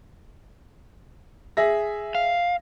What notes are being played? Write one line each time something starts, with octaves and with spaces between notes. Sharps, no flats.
G#4 E5 A#6
F5